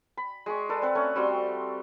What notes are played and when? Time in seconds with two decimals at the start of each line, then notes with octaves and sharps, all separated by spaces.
0.17 B5
0.46 G#3 G#4 C#6
0.69 A4 B4 D5
0.82 C4 B4 F#5
0.95 A3 C#4
1.16 G3 C4 F#4 C6